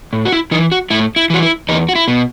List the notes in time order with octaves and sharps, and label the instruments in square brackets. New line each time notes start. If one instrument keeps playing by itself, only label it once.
[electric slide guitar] A2
F#4
E4
E3 D#4
F#4
A2 E4
E4
E3 F#4
E4
E2 D#4
F#4
E4
B2